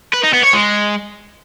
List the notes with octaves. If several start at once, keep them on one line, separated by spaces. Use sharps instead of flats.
B4
D#4
B3
C#5
G#3